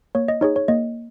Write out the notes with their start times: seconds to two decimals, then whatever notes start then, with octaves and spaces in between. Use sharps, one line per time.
0.15 A#3 C#5
0.28 D#5
0.41 D#4 G#4 C#5
0.56 C#5
0.68 A#3 D#5